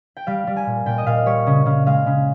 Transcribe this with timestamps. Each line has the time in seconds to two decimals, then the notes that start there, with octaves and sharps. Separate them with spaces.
0.17 G5
0.27 G3 F5
0.47 G3
0.56 G#5
0.66 A#2
0.86 A#2 G5
0.98 D#5
1.06 A#2 F5
1.26 G3 C#5
1.47 C#3
1.66 C#3 F5
1.86 G#3 F5
2.06 C#3